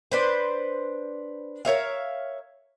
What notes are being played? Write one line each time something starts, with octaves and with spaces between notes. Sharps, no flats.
D4 B4 C5
A#4 C#5 E5 F5